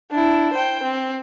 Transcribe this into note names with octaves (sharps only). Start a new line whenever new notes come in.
D4 E4
C5 G5
C4